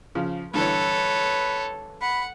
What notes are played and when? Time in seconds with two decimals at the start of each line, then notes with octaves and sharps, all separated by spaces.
0.15 C#3 F3
0.54 G2 D3 E3 A4 B4 C#5
2.01 F#5 B5